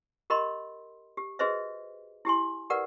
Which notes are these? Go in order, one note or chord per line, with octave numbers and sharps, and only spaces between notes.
G4 A#4 D#5 B5 C6
G4
F#4 G#4 B4 C5 D#5 E5
E4 G4 G#5 C6
G4 A#4 B4 D5 F#5